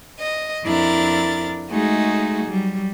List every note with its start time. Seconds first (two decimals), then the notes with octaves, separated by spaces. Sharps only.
0.18 D#5
0.64 F2 D4 E4 A#4 A6
1.70 G#3 A3 D#4 F#4 G#4
2.44 F#3 G3